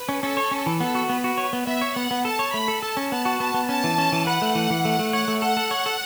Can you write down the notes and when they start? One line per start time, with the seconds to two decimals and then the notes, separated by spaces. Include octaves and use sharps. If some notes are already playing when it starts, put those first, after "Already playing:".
Already playing: B4
0.09 C#4
0.22 C#4 A4
0.37 C#5
0.51 C#4
0.66 E3
0.80 B3 A4
0.95 F#4
1.09 B3 B4
1.24 F#4
1.38 C#5
1.53 B3
1.67 B3 E5
1.81 C#5
1.95 B3 F#5
2.11 B3
2.25 A4 A5
2.39 C#5
2.54 A3 B5
2.68 A4
2.82 A4 A5
2.97 C#4
3.12 B3 A5
3.25 F#4
3.40 B3 A5
3.54 B3
3.69 C#4 A5
3.84 E3
3.98 C#4
4.12 E3
4.27 B4 F#5
4.42 A3
4.55 E3
4.70 E3
4.85 A3
4.99 A3
5.13 C#5 F#5
5.28 A3
5.42 A4 F#5
5.57 A4
5.71 C#5
5.86 A4